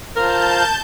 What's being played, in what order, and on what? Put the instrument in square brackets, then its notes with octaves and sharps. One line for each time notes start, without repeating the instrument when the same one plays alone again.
[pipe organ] F4 C5 F5 [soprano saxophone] A#4 [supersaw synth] A5 G6